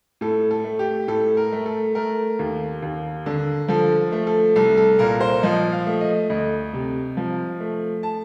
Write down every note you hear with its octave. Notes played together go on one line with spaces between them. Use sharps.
A2 A4
A4
A3
G4
A2 A4
A#4
A3
A4
A3 A#4
D#2
D#2
D3
F3 A4
A3
A4
C2 A4
A4
A#2 A#4
C5
F3 D#5
F5
A3
D#5
D2 D#5
C3
F3
A3
A5